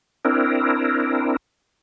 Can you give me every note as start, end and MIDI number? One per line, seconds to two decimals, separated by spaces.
0.25 1.36 60
0.25 1.36 62
0.25 1.36 64
0.25 1.36 70